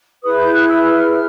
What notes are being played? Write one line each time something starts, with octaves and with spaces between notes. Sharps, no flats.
E4 G#4 B4 D#6
G6
F#6
E6
F6
F6